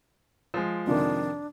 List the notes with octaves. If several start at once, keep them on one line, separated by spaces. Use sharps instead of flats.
F3 G#3
F2 C3 D#3 D4